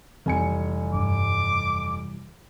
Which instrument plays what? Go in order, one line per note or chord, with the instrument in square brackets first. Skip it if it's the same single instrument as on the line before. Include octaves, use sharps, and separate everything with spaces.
[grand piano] F1 G#5 C#7 [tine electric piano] C3 E3 G3
[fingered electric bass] G2 [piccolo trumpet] D6